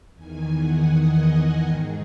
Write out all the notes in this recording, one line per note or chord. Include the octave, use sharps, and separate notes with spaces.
E2 D#3 G#5
F#5
D#5
G#2 D#3 G#4